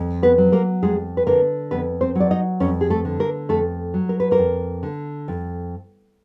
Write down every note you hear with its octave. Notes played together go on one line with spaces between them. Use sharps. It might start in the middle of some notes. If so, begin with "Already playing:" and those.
Already playing: F2
B3 B4
F#3
A#3 A#4
F2 G#3 G#4
B4
D3 A#3 A#4
F2 B3 B4
C4 C5
F#3 D5
D#4 D#5
F2 C#4 C#5
G#4
A3 A4
D3
A#3 A#4
F2 A3 A4
F#3
A#4
B4
A#3 A#4
F2
D3
F2